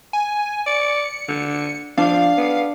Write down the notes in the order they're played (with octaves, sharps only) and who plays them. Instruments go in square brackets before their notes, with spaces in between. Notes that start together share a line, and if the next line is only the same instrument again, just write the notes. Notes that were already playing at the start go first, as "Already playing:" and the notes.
[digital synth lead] G#5
[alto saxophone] D5 [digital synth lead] C#7
[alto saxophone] D3
[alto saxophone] F3 [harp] D4 [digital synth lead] F5
[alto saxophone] B3